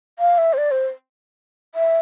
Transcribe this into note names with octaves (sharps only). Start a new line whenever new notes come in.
F5
E5
C5
D5
C5
E5